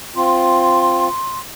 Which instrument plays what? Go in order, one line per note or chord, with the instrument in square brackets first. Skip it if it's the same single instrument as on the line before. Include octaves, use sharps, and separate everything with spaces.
[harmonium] C4 F4 [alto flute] C6